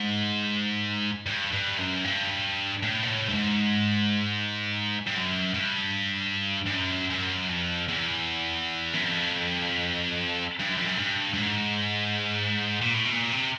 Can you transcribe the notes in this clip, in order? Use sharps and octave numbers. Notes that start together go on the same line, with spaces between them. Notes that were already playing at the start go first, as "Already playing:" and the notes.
Already playing: G#2
G2
G2
F#2
G2
A2
A#2
A2
G2
G#2
G2
F#2
G2
G2
F#2
F#2
F2
E2
F#2
F2
G2
F#2
F2
F#2
G2
G2
G#2
A#2
A2
B2
A#2
C3